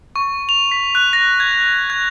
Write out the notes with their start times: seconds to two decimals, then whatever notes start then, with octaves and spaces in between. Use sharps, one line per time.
0.16 C#6
0.49 F7
0.72 B6
0.95 F#6
1.13 A#6
1.40 G#6
1.90 G#6